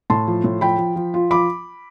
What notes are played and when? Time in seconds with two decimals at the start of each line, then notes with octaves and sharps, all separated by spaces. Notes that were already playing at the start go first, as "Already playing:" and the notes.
0.10 A2 A5 C6
0.27 F3
0.44 A2
0.61 F3 G5 B5
0.78 F3
0.96 F3
1.14 F4
1.31 F3 B5 D6